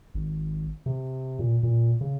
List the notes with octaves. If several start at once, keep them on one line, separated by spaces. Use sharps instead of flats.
G#1
C3
A#2
A#2
C#3